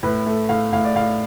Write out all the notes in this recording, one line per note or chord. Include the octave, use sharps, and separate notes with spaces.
A2 B4
A3
A2 F5
A2 F5
D5
A2 F5